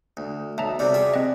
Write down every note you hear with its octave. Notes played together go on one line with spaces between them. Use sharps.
D2
B1 E5 A5 A#5
C3 G3 F#4 D5
F4 G#4 E5
C4 D#5